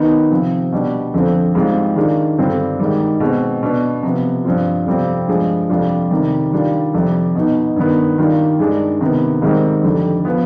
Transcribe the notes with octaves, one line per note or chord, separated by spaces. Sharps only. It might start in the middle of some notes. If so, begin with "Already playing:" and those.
Already playing: D#3 B3 D#4
C3 F3 C4
B2 G3 D4
F2 D3 F3 C4
G#2 G3 C4 F4
D#3 G#3 D4 F4
G2 D3 G3 C4 F4
G#2 D#3 G3
B2 G#3 C4
B2 B3 D4
C3 F3 B3
G2 F3 C4 F4
F2 C3 G3 C4 F4
G2 F3 G#3
F2 C3 G3 D4 F4
C3 D#3 G3
D#3 G3 D4 F4
F2 C3 G3
B2 B3 D#4
G2 D#3 B3
D#3 G3 D4 F4
G2 D#3 G#3 D4
C3 D#3 B3
G#2 D#3 G3 C4
F2 D3 G3
F3 B3